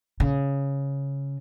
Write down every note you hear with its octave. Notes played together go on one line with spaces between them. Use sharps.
C#3